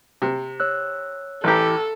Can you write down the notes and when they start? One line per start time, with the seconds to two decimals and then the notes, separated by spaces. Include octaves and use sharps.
0.22 C3
0.60 C#5 E6 F#6
1.44 A1 E3 G4 A4 A#5